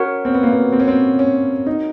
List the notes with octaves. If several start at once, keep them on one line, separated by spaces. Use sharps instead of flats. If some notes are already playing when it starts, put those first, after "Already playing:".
Already playing: C#4 F#4 A#4 C#5 F#5
C4
B3
A#3
B3
C4
C#4
C4
C#4
D#4